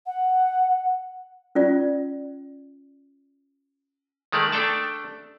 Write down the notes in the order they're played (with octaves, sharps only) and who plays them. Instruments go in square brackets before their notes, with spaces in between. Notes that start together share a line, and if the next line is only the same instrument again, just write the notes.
[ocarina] F#5
[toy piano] C#4 F4 D5
[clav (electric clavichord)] D#3 G#3 A3 D5
A3 D4 A4 G5 A5